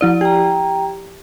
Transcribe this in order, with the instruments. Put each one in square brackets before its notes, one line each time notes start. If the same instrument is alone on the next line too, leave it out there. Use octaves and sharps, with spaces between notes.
[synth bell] F3 E4 D5
[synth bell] G4 [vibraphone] G5 A#5